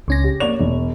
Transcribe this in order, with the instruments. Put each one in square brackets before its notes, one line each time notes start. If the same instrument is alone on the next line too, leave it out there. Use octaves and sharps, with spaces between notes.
[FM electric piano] C#2 C#4 A#6
[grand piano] G4
[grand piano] A#3 D5 F7 [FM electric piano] C#5
[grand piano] E1